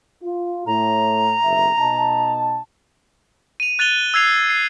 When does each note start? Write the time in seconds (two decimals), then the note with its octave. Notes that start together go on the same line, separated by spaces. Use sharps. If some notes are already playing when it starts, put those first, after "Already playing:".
0.22 F4
0.66 A2 A#5
1.42 F#1 B1 E5
1.77 B2 D#4 A5
3.60 D#7 F7
3.79 F#6 A6 D#7 F7 G7
4.14 E6 G#6 C7 F7
4.50 C7